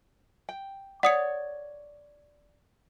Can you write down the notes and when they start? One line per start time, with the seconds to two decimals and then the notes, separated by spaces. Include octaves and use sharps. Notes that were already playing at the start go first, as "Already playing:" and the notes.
0.49 G5
1.03 C#5 D5 F#5 D#6 C#7